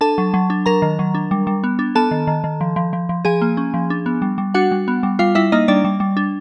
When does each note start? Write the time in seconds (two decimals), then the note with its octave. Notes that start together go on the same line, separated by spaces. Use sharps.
0.01 D4 A4 A5
0.18 F#3
0.34 F#3
0.50 D4
0.66 F#3 A#4 A#5
0.82 D#3
0.99 F#3
1.15 D4
1.31 G3
1.47 G3
1.64 B3
1.79 D4
1.95 B3 A4 A5
2.11 D#3
2.27 D#3
2.44 D#3
2.61 F3
2.76 F3
2.93 F3
3.09 F3
3.25 F3 G#4 G#5
3.42 A#3
3.57 C#4
3.74 F3
3.90 D4
4.06 B3
4.22 G3
4.38 G3
4.54 D4 F#4 F#5
4.71 G3
4.88 B3
5.03 G3
5.19 G3 F4 F5
5.35 G3 E4 E5
5.52 A#3 D#4 D#5
5.68 G3 D4 D5
5.84 G3
6.00 G3
6.17 D4